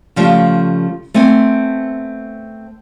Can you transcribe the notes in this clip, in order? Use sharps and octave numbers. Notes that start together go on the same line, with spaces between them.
C#3 F3 G3 A3
A3 B3 C4 G#5